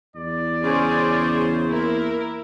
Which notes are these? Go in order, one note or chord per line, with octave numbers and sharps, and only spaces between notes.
E2 D5
C#3 C#4 G#4 C5 C#5
A#3 E4 A#4